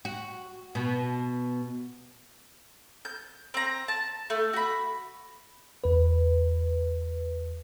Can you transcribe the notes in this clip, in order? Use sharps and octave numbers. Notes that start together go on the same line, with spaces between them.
F#4
B2
G6
C4 A#5
A5
A3
F#4 B5
E2 B4